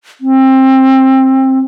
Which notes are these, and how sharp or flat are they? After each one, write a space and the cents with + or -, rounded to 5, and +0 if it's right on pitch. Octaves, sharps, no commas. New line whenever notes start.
C4 +20